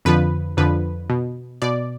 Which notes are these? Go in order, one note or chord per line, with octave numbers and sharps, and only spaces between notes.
F2 D3 F3 B4
F2 D3 F3 B4
B2
B2 D5